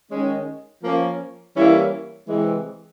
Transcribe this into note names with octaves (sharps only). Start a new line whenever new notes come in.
D#3 G#3 C#4
F3 A#3 C#4
E3 G3 A#3 C#4 E4
C3 E3 G#3